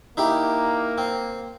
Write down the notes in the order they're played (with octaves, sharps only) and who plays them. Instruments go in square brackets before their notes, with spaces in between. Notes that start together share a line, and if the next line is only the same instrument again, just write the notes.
[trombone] A#3 [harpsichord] D#4 E4 G4
[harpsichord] C4